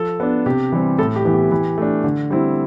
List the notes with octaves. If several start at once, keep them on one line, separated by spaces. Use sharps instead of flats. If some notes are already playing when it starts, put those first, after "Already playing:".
Already playing: F3 A4
B3 D4
C3 G4
E3 G3 C4
A2 A4
G4
E3 B3 E4
G4
E3
A3 D4
D3
G3 C4 E4